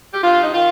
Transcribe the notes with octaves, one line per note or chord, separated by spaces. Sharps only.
G4
G2 F4
D#4
D#3 F4